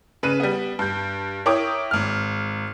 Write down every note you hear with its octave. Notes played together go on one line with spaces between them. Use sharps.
C#3 B4 D#7
G3 B3
G2 G6
E4 A#4 C#5 G5 D6 D#6
G#1 F6